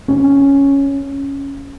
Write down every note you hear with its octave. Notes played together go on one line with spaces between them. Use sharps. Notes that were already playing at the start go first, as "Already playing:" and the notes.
C#4